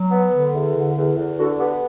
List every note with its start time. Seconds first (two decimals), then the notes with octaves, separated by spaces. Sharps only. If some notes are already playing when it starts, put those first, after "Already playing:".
Already playing: F#3
0.11 B3
0.32 D3
0.54 E2
0.75 D3
0.96 E2
1.16 E2
1.38 D3 F#4 A4
1.59 B3 G4 B4